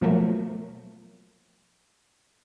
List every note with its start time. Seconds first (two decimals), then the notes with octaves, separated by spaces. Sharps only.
0.01 B2 F3 F#3 A3 A#3